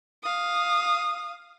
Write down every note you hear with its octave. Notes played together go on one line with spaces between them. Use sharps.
F5 D#6